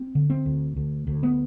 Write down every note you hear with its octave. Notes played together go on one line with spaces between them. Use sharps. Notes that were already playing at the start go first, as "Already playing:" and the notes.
Already playing: C4
D3
C4
D2
D2
D2
B3